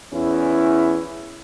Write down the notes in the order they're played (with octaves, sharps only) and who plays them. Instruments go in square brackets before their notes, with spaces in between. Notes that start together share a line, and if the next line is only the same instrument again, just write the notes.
[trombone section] E2 C#4 E4